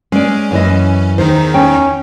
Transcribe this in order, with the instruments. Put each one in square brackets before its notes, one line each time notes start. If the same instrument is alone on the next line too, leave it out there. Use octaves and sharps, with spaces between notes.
[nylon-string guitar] G#3 D5 [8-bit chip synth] C#4
[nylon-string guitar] F#2 E3 D#5
[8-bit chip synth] E2 D#3 D#4 [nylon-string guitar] C5
[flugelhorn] C#4 [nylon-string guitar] G5